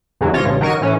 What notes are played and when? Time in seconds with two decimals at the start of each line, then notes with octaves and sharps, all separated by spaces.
0.21 E2 G2 D3 E3 F#3
0.33 G#1 C3 F4 C#5 A#6
0.45 A1 G2 C#3
0.61 D#3 F#3 A#4 C#6 D#7
0.81 A2 E3 C#4